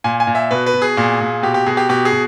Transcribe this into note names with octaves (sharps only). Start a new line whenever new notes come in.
A#2 G#5
G#5
A#2
E5
B2 B4
B4
B2
G#4
A#2
A#2
B2 G4
G4
B2 G#4
G4
B2 G4
G#4
B2